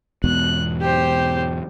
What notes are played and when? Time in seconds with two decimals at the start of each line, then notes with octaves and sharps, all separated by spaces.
0.24 E2 G#2 B2 F#6
0.80 G4 C5